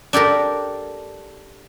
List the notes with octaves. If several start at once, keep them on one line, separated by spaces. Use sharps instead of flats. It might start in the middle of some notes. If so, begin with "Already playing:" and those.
D4 G4 A4 A#4